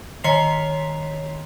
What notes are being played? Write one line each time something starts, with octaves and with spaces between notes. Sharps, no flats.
D#3 C#5 C6 B6 C7 F7